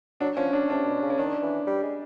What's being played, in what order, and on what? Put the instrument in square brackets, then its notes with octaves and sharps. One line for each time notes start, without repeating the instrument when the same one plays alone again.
[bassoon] F#3 [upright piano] D4
[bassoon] F3 [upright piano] C#4
[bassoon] F#3 [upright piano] D4
[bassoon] C3 [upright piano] D4
[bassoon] B2
C#3
[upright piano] C#4
[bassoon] D#3 [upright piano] D4
[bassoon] E3
G3
G#3